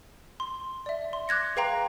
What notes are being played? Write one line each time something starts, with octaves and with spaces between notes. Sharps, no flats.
C6
D5 E5
C6
D6 F#6 G#6 A#6 C#7
G#4 B4 F5 G5 A#5 C6